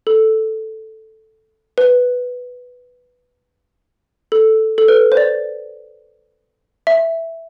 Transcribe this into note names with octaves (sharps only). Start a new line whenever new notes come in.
A4
B4
A4
A4
B4
C5
D5
E5